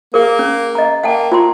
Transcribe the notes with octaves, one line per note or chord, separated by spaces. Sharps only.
A#3 G#4 A#4
C#4
D#5 A#5
A#3 F#5 G5 A5
F4 A#5 C6